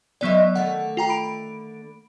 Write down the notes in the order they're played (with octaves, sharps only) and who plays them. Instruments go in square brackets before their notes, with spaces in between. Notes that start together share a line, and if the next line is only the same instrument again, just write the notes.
[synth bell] F#3 B3 D5 [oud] G#3 D#4 E5
[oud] D3 D#3 A3 [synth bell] F#5
[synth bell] F4 G5 A#5
B5 D7